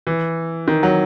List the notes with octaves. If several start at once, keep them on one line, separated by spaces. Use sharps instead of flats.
E3
D#3
F#3